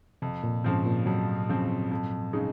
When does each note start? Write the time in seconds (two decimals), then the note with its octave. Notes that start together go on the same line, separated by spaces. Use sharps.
0.22 F2 C3
0.43 A#2
0.64 G#2 C#3 F3 C4
0.86 A#2
1.06 F2 F#3
1.49 C#3 F3 C4
1.91 F2
2.33 C#3 G#3 D#4